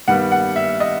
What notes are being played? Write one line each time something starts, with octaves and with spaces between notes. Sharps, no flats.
G2 D#3 G3 B3 F#5
F#5
E5
D#5